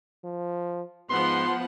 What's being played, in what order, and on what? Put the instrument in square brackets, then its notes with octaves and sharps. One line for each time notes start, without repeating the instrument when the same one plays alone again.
[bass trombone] F3
[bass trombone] G#2 [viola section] F3 B3 F#5 [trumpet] C6